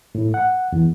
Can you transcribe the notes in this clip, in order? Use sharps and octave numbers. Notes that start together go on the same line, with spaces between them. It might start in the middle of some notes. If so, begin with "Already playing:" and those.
A2
F#5
E2